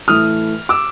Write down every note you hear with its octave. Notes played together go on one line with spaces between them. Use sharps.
A2 E3 A3 D#6 F6
D6 E6